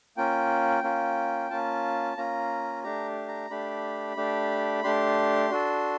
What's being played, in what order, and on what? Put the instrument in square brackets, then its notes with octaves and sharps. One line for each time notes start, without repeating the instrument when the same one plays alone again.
[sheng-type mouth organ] A#3 C#4 F4 G5
A#3 C#4 F4
A#3 C#4 F4 A5
A#3 C#4 F4 A#5
A3 D4 G4 A#5
A#5
A3 D4 G4 B5
A3 D4 G4
A3 D4 G4 C6
D4 F#4 A4